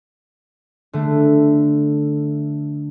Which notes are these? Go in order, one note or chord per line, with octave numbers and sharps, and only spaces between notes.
D3 A3